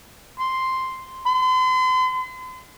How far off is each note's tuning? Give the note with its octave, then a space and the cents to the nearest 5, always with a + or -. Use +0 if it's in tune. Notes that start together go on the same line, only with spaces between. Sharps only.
C6 +0
C6 -40